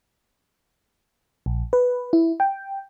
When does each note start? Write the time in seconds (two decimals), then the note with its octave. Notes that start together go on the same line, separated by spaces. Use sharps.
1.46 A#1
1.73 B4
2.13 E4
2.40 G5